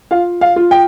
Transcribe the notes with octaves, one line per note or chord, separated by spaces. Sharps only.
F4 F5
F5
F4
G5